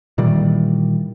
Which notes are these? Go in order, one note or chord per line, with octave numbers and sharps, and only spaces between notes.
A#2 D#3 E3 G3